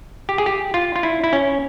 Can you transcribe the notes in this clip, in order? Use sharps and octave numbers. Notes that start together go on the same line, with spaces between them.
G4
G#4
G4
F4
F4
E4
E4
C#4